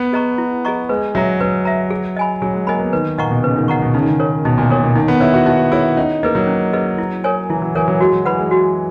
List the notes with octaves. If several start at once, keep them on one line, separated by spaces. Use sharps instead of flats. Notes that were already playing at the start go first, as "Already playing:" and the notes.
Already playing: B3
G#4 D#5 A#5 C#6
E4
G#4 D#5 A#5 C#6
G#3 B4
F#3 E5 A#5
F#3 B4
E5 A#5
G#4
D#5 G#5 B5
F#3 G#4
G#3
A#3 D#5 G#5 B5
B3
D#3 B4
A#2 D#5 F#5 A#5 C#6
B2
C#3 B4
D#3
C#3 D#5 F#5 A#5 C#6
B2
C#3 D#4
D#3
C#3
A#4 C#5
B2 D#4
A#2
A#2 A#4 C#5
B2
D#3 D#4
B3
E4 G#4 C#5
F#4
D#4 F#4
E4 G#4 C#5
C#4 D#4
A#3 G#4 B4 D#5
F#3
C#4
G#4 B4 D#5
E4
A#4 C#5 G#5
E3 E4
F#3
E3 A#4 C#5 G#5
F#3
G#3 F#4
F#3
E3 B4 F#5 B5
G#3
F#4